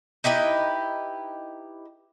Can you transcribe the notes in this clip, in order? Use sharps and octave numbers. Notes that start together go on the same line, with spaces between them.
D#4 E4 G4 B4